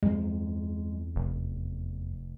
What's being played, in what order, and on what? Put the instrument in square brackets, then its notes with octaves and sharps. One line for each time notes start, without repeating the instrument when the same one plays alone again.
[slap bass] E2 C4 [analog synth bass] G#3
[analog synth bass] F1